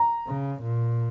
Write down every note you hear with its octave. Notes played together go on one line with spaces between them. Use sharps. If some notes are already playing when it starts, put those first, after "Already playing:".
Already playing: A#5
C#3
A#2